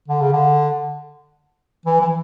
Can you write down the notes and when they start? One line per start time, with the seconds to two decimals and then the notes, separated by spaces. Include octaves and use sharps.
0.08 D3
0.21 C#3
0.32 D3
1.85 E3
2.01 E3